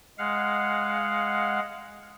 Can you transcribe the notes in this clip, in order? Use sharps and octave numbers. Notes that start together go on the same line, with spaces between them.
G#3 F5 F#5